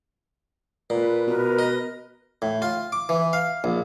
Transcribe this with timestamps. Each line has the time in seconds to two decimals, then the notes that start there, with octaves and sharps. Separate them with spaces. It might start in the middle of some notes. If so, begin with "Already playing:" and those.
0.90 A#2 B4
1.27 B2 A#4 B4
1.59 D#5
2.42 A2
2.62 F4
2.92 D6
3.09 E3
3.33 F5
3.64 A#1